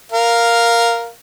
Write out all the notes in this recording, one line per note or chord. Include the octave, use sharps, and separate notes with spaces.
A#4 F5